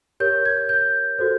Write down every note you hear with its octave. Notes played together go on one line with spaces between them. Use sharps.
G4 A#4 C#5 G6
G#6
G6
F#4 A4 C5